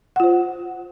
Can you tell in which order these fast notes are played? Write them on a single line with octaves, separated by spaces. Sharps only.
F#5 F4 C5